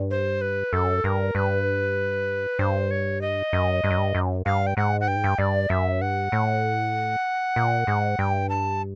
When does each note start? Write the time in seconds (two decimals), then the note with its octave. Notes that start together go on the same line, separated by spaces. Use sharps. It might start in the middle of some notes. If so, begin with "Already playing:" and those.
Already playing: G2
0.11 C5
0.41 B4
0.73 F#2 A4
1.04 G2 A#4
1.35 G2 B4
2.59 G2 C5
2.91 C#5
3.21 D#5
3.53 F#2
3.84 G2
3.91 F#2
3.98 G2
4.15 F#2
4.45 G2 F5
4.67 G5
4.77 G#2 F#5
5.01 F#5
5.08 G2 G5
5.16 G#2
5.24 G2
5.38 G2 D5
5.69 F#2 E5
6.01 G2 F#5
6.32 A2
7.56 A#2
7.87 G#2
8.19 G2 G5
8.49 A5